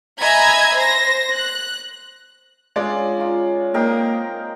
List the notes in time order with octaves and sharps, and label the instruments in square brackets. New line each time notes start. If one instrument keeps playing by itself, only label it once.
[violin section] D#5 E5 G#5 A#5 B5 G#6
C5 A#6
F#6
[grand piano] G#3 D5 [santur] C#4 D4 F4
[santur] C#4 D#4 F4
[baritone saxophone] A#3 [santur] C4 D#4 [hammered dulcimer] A#4 D#5 G5